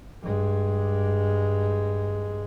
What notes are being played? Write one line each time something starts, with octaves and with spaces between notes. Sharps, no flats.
G2 G#3